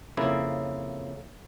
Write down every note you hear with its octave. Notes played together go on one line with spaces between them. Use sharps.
F2 C#3 A#3 E4